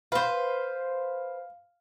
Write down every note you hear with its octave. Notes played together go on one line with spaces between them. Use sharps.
B4 C5 F5